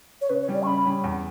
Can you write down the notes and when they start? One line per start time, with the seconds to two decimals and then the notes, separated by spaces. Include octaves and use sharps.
0.21 C#5
0.29 C#3 B4
0.42 C#5
0.48 G3 C#4
0.55 D5
0.63 C#6
0.66 C#3 B5
0.86 G3 C#4
1.04 E2